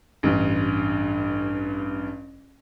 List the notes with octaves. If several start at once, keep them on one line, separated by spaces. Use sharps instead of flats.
A1 G2